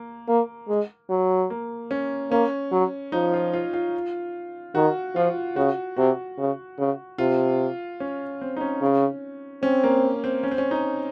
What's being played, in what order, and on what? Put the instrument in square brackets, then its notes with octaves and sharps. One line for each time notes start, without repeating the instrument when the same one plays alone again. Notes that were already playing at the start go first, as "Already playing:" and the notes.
Already playing: [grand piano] A#3
[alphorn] A#3
G#3
F#3
[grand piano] A#3
C#4
[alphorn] A#3 [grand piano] C#4
[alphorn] F#3
[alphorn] F3 [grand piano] D#4
[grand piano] F4
F4
F4
[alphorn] D#3 [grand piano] F#4
[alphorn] F3 [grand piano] F4
[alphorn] C#3 [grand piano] F#4
[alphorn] C3 [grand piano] F#4
[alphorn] C#3
C#3
[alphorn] C3 [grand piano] F4
[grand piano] C#4
C4
D#4
C#4
[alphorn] C#3
[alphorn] C4 [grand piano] C#4
[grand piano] A#3
C4
C#4
C4
C#4
D#4